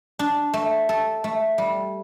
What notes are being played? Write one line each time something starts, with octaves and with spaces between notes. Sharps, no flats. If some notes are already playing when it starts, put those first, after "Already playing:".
D4
A3
A4
A3
G3